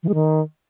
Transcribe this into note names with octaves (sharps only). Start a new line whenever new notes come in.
E3
G#3
D#3